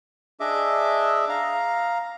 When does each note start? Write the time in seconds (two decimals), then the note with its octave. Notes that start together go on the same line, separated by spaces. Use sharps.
0.40 D4 G#4 D#5 E5 D6
1.29 F5 A#5